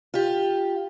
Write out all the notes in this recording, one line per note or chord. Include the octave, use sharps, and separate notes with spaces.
F4 G4